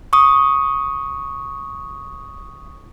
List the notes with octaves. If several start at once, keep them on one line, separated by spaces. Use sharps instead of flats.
C#6 D#6